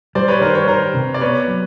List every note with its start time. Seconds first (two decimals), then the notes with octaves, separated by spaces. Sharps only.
0.15 G3 C5 D5
0.28 B4 C#5
0.41 D#3 A#4 C5
0.55 B4 C#5
0.68 D#3 A#4 C5
0.94 C3
1.14 D5
1.21 B3 B4 C#5
1.48 F#3